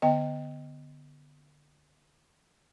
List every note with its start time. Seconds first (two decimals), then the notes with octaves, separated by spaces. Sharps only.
0.02 D3 B3 D#5 G5